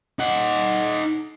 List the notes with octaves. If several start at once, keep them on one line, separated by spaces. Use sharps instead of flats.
D#4 F#5